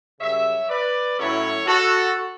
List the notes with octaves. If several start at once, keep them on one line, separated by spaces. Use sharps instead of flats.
F#2 C#3 G3 C#5 E5
B4 D5
A2 F#3 C#4 E4 A4 C#5
F#4 A4